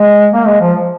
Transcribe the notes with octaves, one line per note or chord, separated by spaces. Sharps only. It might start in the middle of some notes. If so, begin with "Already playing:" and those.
Already playing: G#3
A#3
G#3
F3